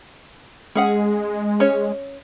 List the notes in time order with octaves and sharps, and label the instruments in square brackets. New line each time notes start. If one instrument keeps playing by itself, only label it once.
[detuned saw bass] G#3 [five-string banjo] C#4 G#4 F#5
[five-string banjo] C#4 C#5